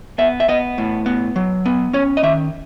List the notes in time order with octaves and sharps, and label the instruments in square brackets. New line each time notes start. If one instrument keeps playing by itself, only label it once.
[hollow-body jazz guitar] B3 E5
E5
B3 D#5
A2
B3
F#3
B3
C#4 C#5
D#5
D#3 E5